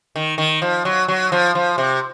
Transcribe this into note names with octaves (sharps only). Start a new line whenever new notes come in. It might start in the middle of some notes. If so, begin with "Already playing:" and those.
D#3
D#3
F3
F#3
F#3
F3
F3
C3